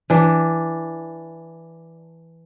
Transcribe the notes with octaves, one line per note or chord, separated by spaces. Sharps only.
E3 D4